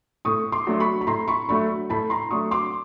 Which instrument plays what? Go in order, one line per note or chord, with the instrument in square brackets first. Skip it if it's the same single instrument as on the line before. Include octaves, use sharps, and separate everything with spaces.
[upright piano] A2 [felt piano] C#6 D#6
[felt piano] C6 D6
[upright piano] F#3 A3 D4
[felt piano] B5 C#6
B5
[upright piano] A2 [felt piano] A#5 C6
[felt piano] B5 C#6
[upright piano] F#3 A3 D4 [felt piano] B5 C#6
[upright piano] A2 [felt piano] A5 B5
[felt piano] A#5 C6
[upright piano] F#3 A3 D4 [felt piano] C#6 D#6
[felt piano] C6 D6